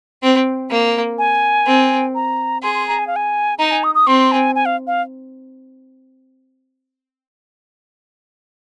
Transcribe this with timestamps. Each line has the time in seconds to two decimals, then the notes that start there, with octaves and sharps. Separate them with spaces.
0.23 C4
0.71 A#3
1.18 G#5
1.67 C4
2.15 A#5
2.63 G#4 C6
2.75 C6
2.87 A#5
2.99 G#5
3.07 F5
3.16 G#5
3.59 D#4 A#5
3.71 G#5
3.84 D#6
3.95 D#6
4.07 C4 C6
4.32 G#5
4.55 G#5
4.66 F5
4.87 F5